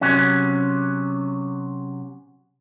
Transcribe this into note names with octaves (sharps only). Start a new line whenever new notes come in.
C3 F#3 C#4